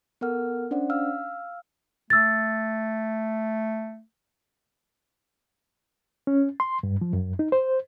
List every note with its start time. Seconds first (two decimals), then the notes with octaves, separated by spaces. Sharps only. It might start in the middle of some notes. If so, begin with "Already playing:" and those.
0.21 B3 A4 A#4 F#5 F6
0.71 C#4 D4 C5 D5 F#5
0.90 F5 E6 F6
2.10 A3 E6 A6
6.27 C#4
6.60 C6
6.83 G2
7.01 F3
7.13 F#2
7.39 D#4
7.52 C5